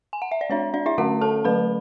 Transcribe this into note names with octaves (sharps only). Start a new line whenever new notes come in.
G#5
F#5
E5
D5
G#3 D4 C#5
D4 D5
E4 E5
D3 A3 C#4 F#4 F#5
A4 A5
D3 F#3 A3 B4 B5